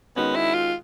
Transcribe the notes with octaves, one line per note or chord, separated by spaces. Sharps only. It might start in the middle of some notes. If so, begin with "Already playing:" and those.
D#3 G#3 B3 C#4 F#4
E4
F4